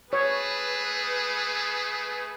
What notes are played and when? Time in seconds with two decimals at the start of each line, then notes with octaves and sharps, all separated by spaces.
0.13 A3 G#4 B4 C#5